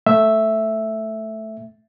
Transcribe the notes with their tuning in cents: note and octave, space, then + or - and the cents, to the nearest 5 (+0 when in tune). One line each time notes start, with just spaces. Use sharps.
A3 +0 E5 +0